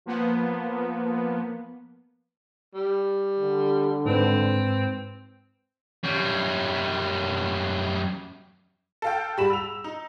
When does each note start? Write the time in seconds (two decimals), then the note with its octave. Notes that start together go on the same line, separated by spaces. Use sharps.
0.06 F3 A#3 B3
2.74 G3
3.40 D3
4.05 G#2 C4 B4
6.03 F#2 G3
9.02 A4 F5 G5
9.37 G#2 G3 B5 E7
9.50 E6 F7
9.84 D#4